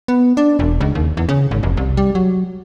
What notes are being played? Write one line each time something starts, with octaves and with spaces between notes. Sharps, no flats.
B3
D4
E1
C#2
D#2
E2
C#3
G#1
F1
C2
G3
F#3